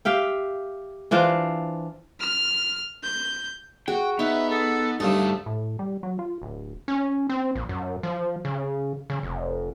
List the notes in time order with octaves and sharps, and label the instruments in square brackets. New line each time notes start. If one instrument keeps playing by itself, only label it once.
[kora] G4 E5 F5 G5
E3 D4 F4 C5
[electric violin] F6
G6
[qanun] F#4 [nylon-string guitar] G#4 [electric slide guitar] G5
[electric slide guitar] B3 [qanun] D#4 [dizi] E5
[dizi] A4
[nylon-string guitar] D2 G3 F5 [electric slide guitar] G2 A3 [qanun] A4 [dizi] D#6
[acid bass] A2
G3
F#3
F4
D1
C#4
C4
A#1
F#2
F3
C#3
C#3
F1